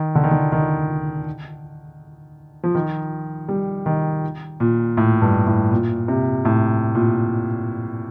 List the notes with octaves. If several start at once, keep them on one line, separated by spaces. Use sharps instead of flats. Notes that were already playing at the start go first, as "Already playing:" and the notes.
Already playing: D#3
D3
D#3
D3
D#3
F3
D#3
G3
D#3
A#2
A2
G2
A2
A#2
C3
A2
A#2